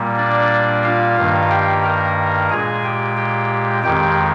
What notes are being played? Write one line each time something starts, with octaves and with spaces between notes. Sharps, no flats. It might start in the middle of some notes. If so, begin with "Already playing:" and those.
Already playing: A#2 G3 A#3
D4 D5
F4 F5
G2 D#3 A#3
G4 G5
A#4 A#5
A#2 G#3 G#4 G#5
G4 G5
G4 G5
F2 D#3 G#3 G4 G5